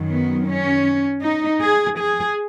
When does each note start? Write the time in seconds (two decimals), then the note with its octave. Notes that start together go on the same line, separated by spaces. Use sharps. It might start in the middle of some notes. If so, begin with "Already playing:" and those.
Already playing: F#2 D#3 F#3
0.10 B3
0.47 C#4
1.22 D#4
1.61 G#4
1.99 G#4